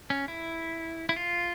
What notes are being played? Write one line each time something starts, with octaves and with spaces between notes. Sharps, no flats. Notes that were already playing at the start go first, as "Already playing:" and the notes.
C#4
E4
E4
F4